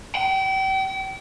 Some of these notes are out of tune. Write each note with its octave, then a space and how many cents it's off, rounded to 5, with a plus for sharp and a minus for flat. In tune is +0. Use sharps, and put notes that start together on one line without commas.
G5 -35